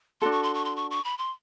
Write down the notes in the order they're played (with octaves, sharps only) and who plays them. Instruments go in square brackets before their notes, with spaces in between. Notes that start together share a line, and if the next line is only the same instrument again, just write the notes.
[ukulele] D4 F#4 A4 [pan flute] C6
[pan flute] C#6
C6
C#6
C6
C#6
C#6
B5
C6